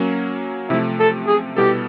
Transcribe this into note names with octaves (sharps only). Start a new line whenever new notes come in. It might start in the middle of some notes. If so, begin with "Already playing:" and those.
Already playing: F#3 A#3 C#4
C3 F3 A3 E4
A4
G#4
B2 G3 B3 E4 G4 A4